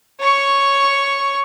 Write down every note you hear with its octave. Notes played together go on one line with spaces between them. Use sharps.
C#5 C#6